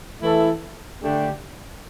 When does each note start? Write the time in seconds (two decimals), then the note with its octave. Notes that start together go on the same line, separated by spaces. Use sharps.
0.22 E3 A3 E4 A4
1.02 D3 A3 D4 G4